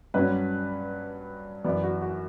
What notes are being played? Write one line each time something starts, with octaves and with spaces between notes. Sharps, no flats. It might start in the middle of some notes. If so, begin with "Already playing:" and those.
G2 F#3 C#4 B4
F#2 E3 B3 D5
F#4
F#4